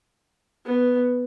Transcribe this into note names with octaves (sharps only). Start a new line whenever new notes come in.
B3